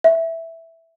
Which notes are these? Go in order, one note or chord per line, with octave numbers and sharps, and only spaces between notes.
E5